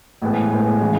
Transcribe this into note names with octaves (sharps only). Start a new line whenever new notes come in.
A1 A2 G#3 B3
A1 A2 G#3 B3
C#3 E3 G#3